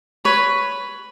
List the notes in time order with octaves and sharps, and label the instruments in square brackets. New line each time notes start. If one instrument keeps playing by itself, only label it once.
[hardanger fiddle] B4 [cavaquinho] C#5